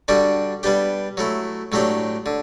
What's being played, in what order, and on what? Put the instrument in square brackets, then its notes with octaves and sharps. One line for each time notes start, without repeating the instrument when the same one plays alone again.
[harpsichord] D3 G3 D4 F#4
G3 B3 D4 G4
F#3 A3 E4
A2 F#3 A3 D4 G4
D3